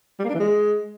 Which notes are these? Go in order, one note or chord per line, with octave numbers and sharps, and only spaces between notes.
G3
A#3
D4
E3
G#3